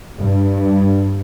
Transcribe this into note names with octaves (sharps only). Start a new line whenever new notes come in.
G2